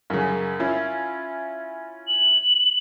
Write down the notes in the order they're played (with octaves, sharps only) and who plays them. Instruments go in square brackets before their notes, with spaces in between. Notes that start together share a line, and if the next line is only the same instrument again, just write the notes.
[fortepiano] F#2 C#3
C#4 E4 F4
[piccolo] F#7